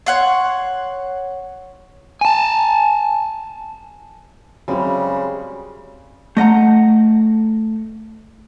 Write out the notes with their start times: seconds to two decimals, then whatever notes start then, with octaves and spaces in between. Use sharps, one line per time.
0.06 C#5 F#5 C6
2.21 G#5 A5
4.68 F#2 C#3 G3 G#3 C4
6.37 A3 D#5 F#5 A#5